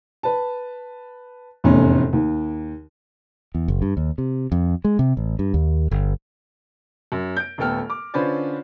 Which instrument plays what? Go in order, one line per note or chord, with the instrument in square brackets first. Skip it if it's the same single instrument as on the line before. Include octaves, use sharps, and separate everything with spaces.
[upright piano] B4 A5
F1 E2 A2 C#4
D#2
[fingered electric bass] E2
F#1
G2
D#2
C3
F2
G#3
C3
A1
G2
D#2
G1
[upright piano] F#2
G6 D7
D#1 A3 B3 A4 G5 F6
D6
D3 C#4 F4 B4 C5 D5